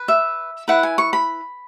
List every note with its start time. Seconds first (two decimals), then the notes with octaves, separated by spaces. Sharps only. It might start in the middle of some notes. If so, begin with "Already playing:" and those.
Already playing: B4
0.08 E5
0.68 E4 B4 F#5
0.83 G#5
0.98 C#6
1.13 B5